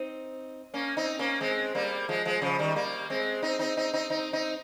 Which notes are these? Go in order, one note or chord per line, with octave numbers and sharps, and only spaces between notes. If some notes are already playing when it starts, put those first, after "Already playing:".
Already playing: C4 D#4
A#3 C#4
C4 D#4
A#3 C#4
G#3 C4
G3 A#3
F3 G#3
F3 G#3
C#3 F3
D#3 G3
G3 A#3
G#3 C4
C4 D#4
C4 D#4
C4 D#4
C4 D#4
C4 D#4
C4 D#4